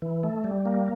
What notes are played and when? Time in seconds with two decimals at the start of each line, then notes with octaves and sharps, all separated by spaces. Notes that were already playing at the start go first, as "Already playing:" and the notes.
0.02 E3
0.23 A3
0.44 G3
0.65 A#3